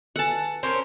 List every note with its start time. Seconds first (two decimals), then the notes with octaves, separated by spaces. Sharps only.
0.16 A4 B4 F#5 G#5 A5
0.63 C4 C#4 A#4